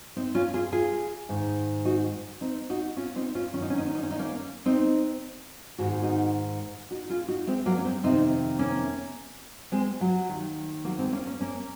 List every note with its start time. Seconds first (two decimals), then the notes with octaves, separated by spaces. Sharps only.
0.16 C4 D#4
0.35 C#4 F4
0.54 F4 G#4
0.72 F4 G#4
1.29 G#2 D#3
1.85 D#4 F#4
2.41 C4 D#4
2.70 D#4 F#4
2.97 C#4 F4
3.16 C4 D#4
3.35 C#4 F4
3.53 F#2 D#3 C#4
3.62 D#4
3.70 C#4
3.78 D#4
3.86 C#4
3.95 D#4
4.03 C#4
4.11 D#4
4.19 A#3 C#4
4.66 C4 D#4
5.78 G#2 D#3 F#4
5.90 G#4
6.02 D#4 F#4
6.91 D#4 F#4
7.09 F4 G#4
7.28 D#4 F#4
7.47 G#3 C4
7.66 F#3 A#3
7.77 C#4
7.85 G#3 C4
8.03 F2 C3 D#3 C4 D#4
8.59 A#3 C#4
9.72 G#3 C4
10.01 F#3
10.29 D#2 D#3
10.84 F#3 A#3
10.99 G#3 C4
11.13 A#3 C#4
11.27 A#3 C#4
11.40 A#3 C#4